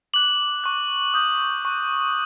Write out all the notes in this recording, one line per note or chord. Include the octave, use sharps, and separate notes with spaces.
D6 F#6 F#7
C#6 F#6
D#6 G6
C#6 F#6